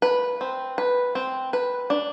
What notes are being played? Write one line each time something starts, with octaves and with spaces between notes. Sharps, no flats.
B4
C4
B4
C4
B4
D4